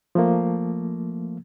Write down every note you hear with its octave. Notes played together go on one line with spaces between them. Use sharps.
F3 A3 A#3